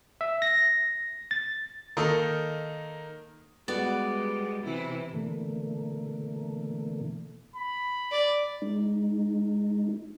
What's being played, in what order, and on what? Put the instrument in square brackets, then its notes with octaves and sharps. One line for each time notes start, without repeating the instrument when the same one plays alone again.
[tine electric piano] E5
A#6
A6
[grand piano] D#3 A#3 D#4 A4
[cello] G3 [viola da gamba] G#3 [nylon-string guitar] B3 F#4 [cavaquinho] D5
[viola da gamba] C3 E3 [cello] E4
[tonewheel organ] B2 D3 E3 A3 A#3
[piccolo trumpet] B5
[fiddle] D5
[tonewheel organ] G#3 D#4